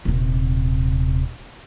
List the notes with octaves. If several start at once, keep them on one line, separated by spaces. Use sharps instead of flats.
D#1 C3